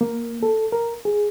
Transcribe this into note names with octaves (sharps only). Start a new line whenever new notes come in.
A#3
A4
A#4
G#4